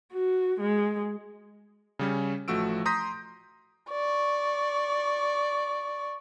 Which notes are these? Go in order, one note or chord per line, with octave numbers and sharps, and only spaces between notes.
F#4
G#3
C#3 G3 C#4
A1 F3 A3 F#4 E6 D7
A#5 C6 D#6 G6 A#6 B6
D5 C#6